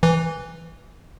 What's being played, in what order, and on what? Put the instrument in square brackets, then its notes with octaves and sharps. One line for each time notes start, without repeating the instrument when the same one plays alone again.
[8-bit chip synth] E3